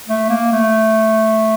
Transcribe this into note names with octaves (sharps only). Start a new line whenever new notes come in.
A3
A#3
A3